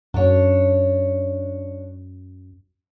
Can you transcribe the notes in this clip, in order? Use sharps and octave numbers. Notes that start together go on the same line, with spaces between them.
F#2 D4 C#5